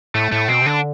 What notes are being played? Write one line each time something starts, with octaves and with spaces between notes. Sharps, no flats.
A2 A3
A2 A3
B2 C4
C3
D3 D4